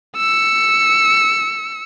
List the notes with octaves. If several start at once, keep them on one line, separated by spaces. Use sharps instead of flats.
E6 C#7